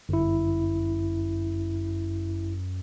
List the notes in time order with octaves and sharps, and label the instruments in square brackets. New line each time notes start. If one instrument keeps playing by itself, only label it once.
[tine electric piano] G1 E4 [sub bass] F#2